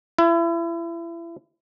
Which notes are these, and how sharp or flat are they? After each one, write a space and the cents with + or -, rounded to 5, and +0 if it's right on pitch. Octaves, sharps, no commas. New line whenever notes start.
E4 +35